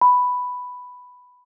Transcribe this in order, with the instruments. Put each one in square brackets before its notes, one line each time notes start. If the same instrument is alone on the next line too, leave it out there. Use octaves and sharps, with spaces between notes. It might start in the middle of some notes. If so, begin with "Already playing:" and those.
[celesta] B5